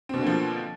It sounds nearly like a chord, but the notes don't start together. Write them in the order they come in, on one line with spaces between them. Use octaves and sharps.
C4 B2 D3 A#3 F3